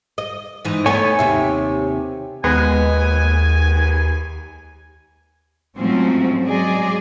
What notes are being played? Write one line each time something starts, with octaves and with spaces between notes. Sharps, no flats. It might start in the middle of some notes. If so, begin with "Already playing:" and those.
D#5
G#2 E3 D#4
A3 B3 D#4 C#5 G#5 C#6
D#2 C3 E5
D#2 G#3 B3 G#5
G#2 F3 F#3 A3 C4 C#4
F#3 G#3 G#4 D5 D#5